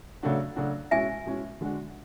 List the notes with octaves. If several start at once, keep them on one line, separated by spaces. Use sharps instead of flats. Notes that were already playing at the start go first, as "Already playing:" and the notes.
C#3 F#3 A3 D4 F#4
C#3 F#3 A3 D4 F#4
B2 G#3 C#4 E4 E5 G#5
B2 G#3 C#4 E4
D3 G#3 D4 F#4